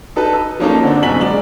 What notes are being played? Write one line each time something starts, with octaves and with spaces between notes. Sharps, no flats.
D#4 A4 B4
E6
F3 A#3 C#4 D#4 A4
D3 C4 D4
F#1 B2 G#5 A#5 B6 F#7
G#3 F4 D5 F#7